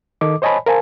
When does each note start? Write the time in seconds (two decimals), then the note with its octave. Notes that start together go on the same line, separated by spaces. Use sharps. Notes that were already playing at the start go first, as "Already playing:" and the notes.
0.21 D#3 A4 D#5 D6
0.42 C5 C#5 D#5 G#5 A5 B5
0.66 A#4 C5 F5 G#5 A5